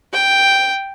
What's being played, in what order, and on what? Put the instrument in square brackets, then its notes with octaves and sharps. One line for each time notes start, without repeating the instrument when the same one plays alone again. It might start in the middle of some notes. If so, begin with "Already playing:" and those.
[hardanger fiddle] G5